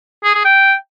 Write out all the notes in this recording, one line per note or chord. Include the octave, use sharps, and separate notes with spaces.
G#4
G#4
G5